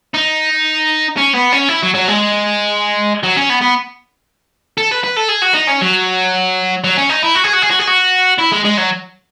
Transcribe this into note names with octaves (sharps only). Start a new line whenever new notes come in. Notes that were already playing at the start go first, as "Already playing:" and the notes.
D#4
C#4
B3
C#4
E4
F#3
F#3
G#3
F#3
C#4
B3
B3
A4
B4
B4
A4
G#4
F#4
D#4
C#4
F#3
F#3
C#4
D#4
E4
F#4
G#4
F#4
G#4
F#4
G#4
F#4
E4
G#3
G#3
F#3